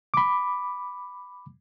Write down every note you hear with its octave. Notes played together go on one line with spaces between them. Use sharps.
B5 D6